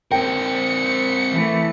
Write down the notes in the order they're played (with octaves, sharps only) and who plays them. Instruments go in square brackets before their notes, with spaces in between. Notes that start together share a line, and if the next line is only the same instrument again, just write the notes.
[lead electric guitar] C4 A#4 [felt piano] G5 [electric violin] C#7
[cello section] E3 A3